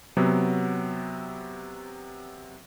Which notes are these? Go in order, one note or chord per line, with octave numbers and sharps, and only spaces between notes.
C3 F#3 B3